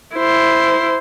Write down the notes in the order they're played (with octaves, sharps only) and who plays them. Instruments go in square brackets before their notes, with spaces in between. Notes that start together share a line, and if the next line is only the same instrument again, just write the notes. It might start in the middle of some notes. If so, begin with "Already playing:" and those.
[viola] E4 C5